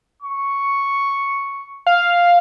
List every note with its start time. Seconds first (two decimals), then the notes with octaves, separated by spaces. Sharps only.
0.22 C#6
1.87 F5